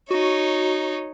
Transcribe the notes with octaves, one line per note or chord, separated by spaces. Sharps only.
D#4 F#4 C#5